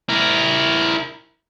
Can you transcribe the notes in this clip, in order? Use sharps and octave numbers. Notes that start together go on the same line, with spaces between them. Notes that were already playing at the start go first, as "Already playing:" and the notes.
E4 A#4